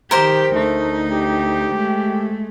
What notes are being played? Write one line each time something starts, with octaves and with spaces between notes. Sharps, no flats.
D#3 G4 A#4 C5
D2 A3 D#4
G4
G#3 A3